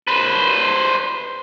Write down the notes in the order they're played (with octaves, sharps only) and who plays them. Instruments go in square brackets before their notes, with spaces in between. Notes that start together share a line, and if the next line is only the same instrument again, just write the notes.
[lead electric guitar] B4 C5